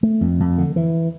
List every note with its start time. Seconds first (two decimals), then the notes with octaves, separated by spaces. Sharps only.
0.03 A3
0.21 F2
0.40 F2
0.58 D3
0.76 E3